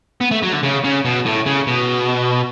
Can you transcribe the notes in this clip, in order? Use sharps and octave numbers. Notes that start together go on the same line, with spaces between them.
B3
A3
F#3
D3
C#3
C#3
B2
A2
C#3
B2